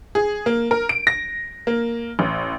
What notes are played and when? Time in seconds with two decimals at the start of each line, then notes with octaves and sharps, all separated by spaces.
0.15 G#4
0.46 A#3
0.71 A#4
0.89 D7
1.07 A#6
1.67 A#3
2.19 A1